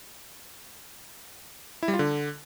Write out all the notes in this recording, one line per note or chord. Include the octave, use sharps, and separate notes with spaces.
E4
G3
F4
D3